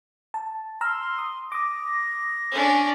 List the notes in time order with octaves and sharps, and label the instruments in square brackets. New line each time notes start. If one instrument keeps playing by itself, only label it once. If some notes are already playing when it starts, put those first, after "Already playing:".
[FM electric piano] A5
[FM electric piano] A#5 E6 F6 [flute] C6
[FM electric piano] D#6
[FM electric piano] D6 D#6 [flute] A#6
[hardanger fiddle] C#4 D4